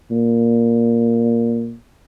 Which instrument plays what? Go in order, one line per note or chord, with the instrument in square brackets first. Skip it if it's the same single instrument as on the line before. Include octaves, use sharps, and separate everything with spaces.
[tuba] A#2